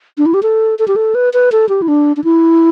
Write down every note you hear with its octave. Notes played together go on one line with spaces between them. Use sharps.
D4
E4
G4
A4
A4
G4
A4
B4
B4
A4
G4
E4
D4
D4
E4